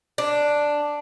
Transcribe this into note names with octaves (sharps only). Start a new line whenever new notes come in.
D4